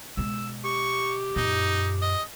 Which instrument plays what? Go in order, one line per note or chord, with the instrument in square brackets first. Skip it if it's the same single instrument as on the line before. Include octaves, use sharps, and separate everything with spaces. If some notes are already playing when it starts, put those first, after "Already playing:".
[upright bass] B2 G#3 [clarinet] E6
[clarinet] G4 [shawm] C#6
[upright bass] F#2 A#2 [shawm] D#4
[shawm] D#5